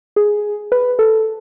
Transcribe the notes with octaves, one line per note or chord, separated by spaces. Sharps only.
G#4
B4
A4